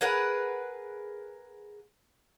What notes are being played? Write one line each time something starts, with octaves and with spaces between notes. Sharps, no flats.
G#4 A#4 B4 F#5